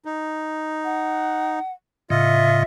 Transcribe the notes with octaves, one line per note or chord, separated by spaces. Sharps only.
D#4
F#5
A2 C#3 F4 D#5 E5